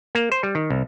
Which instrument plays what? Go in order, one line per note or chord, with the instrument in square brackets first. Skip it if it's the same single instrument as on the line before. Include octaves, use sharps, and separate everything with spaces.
[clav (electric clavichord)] A#3
C5
G3
D#3
C2